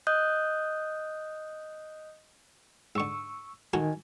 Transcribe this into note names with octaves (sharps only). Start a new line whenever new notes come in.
D#5 D#6 F#6 G6
G#2 D3 C#6 E6
D#3 F#4 A4 A#4 G#5